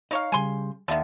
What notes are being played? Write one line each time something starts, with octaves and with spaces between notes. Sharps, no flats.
D#4 C#5 D#5 F5
C#3 G3 G#5 C6
D#2 D3 D#3 D5 E5